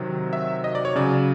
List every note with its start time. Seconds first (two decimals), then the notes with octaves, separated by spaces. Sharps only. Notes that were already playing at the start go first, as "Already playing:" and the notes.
Already playing: C3 D#3 F#3
0.33 E5
0.64 D#5
0.75 D5
0.85 C#5
0.96 C#3 F#3 D5